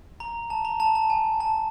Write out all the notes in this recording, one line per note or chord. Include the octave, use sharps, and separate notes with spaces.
A#5
A5
A#5
A5
A5
G#5
A5